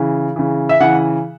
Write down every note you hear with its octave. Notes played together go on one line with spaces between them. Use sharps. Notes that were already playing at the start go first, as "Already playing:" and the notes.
Already playing: C#3 E3
C#3 E3
E5
C#3 E3 F#5